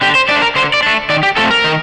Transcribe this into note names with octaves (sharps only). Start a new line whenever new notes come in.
D3 G4
C5
A3 D4 D5
A#4
D3 C5
D5
A3 D4
D#3 D5
G4
A3 C4 F4 A4
A#4
D#3